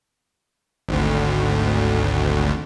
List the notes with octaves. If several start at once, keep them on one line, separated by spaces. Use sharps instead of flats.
G#1 D2